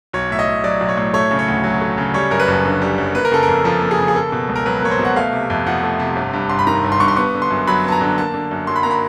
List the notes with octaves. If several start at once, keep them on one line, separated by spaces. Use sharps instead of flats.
B1 C#5
A2 E5
D#5
B1
F#3 D5
B1
C#5
A2
A3 C#5
C#3
C#5
D2
F#3
A3
C#3
G3 C#5
F#2 A#4
B4
F#1
D3
G3
F#2
A#3 B4
A#4
C#3 A4
A#4
F2
F3 A4
A#3
G#4
C#3
G#4
A#3 A4
B2
C#2
A#4
F#3 B4
A#3 C#5
C5
B2
F#5
A3 F5
C3
F2
F3 F#5
A3
C3
G1
G2
G1 C6
B5
D#3 A#5
G1
C6
G2 C#6
C6
B3 C#6
D3
C6
F#2
F#3 B5
B3 A5
A#5
D3
A#3 A5
D3
F#2
F#3 C6
B5
A#3 A#5
B5